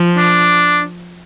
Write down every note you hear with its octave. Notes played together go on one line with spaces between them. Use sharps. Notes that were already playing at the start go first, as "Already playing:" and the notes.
Already playing: F3
D4